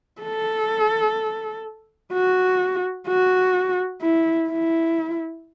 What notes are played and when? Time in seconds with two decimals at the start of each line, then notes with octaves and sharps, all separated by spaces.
0.22 A4
2.13 F#4
3.07 F#4
4.02 E4
4.49 E4